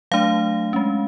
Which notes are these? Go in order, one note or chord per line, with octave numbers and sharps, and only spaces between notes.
F#3 A3 D4 F5
G#3 C#4